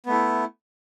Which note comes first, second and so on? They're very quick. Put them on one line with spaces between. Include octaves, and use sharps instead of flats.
B3 A3 E4